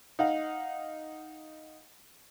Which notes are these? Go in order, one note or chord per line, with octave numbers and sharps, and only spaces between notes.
D#4 F5 F#5